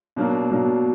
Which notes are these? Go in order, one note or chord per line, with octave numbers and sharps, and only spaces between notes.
B2 F#3 A#3 D4 A#4
B2 F#3 A#3 D4 A#4